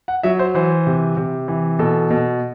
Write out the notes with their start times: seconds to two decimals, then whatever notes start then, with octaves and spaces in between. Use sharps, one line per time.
0.08 F#5
0.23 F#3 E5
0.39 C5
0.55 E3 C5
0.87 C3
1.17 C3
1.48 E3
1.79 B2 A4
2.10 B2